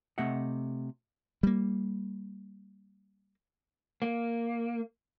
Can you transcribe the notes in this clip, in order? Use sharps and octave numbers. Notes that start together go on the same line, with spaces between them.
C3 A3 D#5 E5 F#5
G3 A#3
A#3